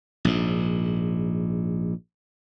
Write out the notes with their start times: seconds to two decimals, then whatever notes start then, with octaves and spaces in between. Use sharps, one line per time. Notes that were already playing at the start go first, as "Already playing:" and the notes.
0.25 A#1 G#2